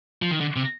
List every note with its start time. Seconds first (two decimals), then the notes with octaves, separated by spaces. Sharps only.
0.22 F3
0.31 D#3
0.41 D3
0.56 C3